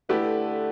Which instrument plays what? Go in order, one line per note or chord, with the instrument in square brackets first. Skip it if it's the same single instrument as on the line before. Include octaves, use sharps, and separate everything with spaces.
[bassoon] D3 [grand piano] A3 E4 G4 B4